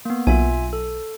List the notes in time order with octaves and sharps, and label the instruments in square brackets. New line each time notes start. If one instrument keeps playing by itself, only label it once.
[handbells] A#3 B3
[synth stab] B1 [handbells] F4 E5 G#5
[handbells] A4